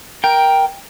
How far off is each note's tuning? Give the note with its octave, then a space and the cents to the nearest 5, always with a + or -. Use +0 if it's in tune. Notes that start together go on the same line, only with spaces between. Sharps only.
A#4 +10 G5 +0